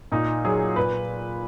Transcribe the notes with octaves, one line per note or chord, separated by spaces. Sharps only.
A#2 D#4
F#3 G#4
A#2 B4